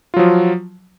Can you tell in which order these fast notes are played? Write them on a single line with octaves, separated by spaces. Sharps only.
F4 F#3 F3